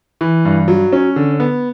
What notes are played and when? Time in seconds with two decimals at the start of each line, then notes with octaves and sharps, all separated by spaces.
0.21 E3
0.45 G2
0.68 F#3
0.92 C#4
1.16 D3
1.40 B3